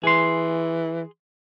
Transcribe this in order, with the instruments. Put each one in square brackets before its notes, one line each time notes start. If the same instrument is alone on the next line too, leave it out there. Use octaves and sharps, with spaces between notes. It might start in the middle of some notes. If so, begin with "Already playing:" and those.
[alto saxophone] E3 [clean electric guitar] G#4 C6